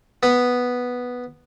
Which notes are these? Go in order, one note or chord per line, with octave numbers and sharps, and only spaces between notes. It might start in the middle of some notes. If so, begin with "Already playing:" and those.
B3